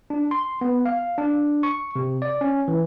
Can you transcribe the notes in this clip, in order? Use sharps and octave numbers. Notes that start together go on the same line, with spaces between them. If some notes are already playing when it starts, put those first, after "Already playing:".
D4
C6
B3
F5
D4
C#6
C3
D5
C#4
E3